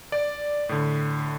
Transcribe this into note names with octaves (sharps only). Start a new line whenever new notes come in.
D5
A2 D3